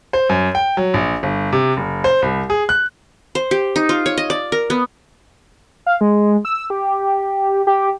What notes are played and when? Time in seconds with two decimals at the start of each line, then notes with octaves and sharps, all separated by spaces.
0.13 C5
0.29 F#2
0.55 G5
0.77 F#3
0.94 A#1
1.23 G1
1.53 C3
1.77 F#1
2.04 C5
2.22 C2
2.50 G#4
2.69 F#6
3.35 C5
3.51 G4
3.76 D#4
3.89 F4
4.06 C#5
4.18 D#5
4.30 D5
4.52 A#4
4.70 B3
5.86 F5
6.01 G#3
6.45 E6
6.70 G4
7.67 G4